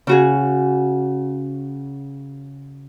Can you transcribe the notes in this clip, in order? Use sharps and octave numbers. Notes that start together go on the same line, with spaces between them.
C#3 F#4 G#4